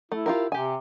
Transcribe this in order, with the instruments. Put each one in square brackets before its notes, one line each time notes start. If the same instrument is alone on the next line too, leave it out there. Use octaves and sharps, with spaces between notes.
[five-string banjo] A3 [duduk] E4
[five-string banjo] F4 G4 A#4
[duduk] C3 [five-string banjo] G4 G#5